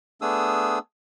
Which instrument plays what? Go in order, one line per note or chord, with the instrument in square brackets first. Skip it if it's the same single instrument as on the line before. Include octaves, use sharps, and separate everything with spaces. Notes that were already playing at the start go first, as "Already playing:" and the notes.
[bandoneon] A3 B3 D4 G#4 D#6 E6